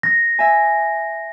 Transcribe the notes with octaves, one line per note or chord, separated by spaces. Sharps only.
A#6
E5 G#5